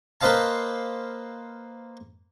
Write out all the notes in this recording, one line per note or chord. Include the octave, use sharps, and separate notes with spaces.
A#3 B4 C5 D#5 F5 A5